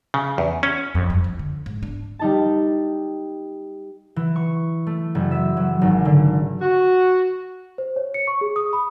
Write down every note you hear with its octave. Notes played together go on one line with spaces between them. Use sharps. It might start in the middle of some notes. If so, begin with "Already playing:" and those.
C#3
E2
C#4
F2
G2
F3
D3
G#2
D4
G3 D#4 A5
E3
C#6
A3
F#1
E5
F#3
G#1
D3
F#4
C5
C#5
C#7
C#6
G#4
D#6
B5